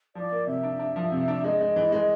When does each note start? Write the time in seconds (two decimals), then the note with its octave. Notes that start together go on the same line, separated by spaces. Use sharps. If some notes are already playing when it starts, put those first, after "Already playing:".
0.15 F3 D5
0.31 A#3
0.47 C3 E5
0.63 D4
0.79 D4
0.96 F3
1.12 C3
1.28 D4
1.44 G#3 D#5
1.61 G#3
1.76 E3
1.92 G#3